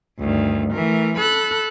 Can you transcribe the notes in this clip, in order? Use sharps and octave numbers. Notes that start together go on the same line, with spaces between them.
D2 G2 D#3
E3 A3 A#4
A4 B5 F#6